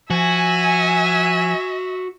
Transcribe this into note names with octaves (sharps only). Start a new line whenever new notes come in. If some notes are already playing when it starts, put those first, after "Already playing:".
F3 F#4 E5 G#5